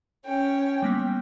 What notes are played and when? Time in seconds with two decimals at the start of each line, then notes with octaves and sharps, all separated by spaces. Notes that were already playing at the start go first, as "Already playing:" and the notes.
0.25 C#4 G5
0.82 G3 A#3 B3